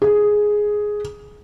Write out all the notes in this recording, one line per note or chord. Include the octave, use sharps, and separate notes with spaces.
G#4